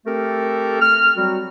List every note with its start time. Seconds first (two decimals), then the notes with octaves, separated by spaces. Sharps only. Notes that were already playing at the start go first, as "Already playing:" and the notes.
0.06 A3 C4 G4 A4 A#4
0.81 F6
1.16 F#3 G3 C4 F#4